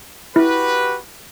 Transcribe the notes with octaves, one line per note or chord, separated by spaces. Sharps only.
E4 F#4 G4 B4